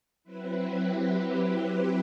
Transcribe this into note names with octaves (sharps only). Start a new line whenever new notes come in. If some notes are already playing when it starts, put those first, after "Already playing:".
F#3 C4 E4 B4
G4
G4
G4